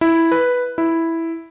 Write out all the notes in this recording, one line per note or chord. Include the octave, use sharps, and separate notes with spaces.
E4
B4
E4